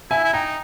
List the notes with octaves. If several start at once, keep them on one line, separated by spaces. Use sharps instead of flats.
E4 E5 G#5
E4
D#4 G5 A#5